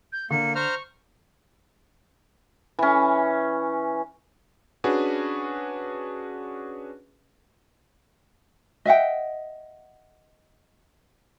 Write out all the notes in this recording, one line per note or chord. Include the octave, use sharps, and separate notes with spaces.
G6
D3 A#3 C#7
C5 A#5 C#6 F6
E3 C#4
C#4 D4 F#4 G#4 B4
D#5 E5 F#5 G5